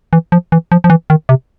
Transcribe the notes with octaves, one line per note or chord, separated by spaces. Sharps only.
E3
F3
E3
F3
F3
E3
D#3
C3